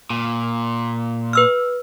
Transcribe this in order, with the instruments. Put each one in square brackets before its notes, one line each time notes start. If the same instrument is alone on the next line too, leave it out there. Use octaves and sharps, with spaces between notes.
[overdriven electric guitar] A#2
[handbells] B4 E6 F6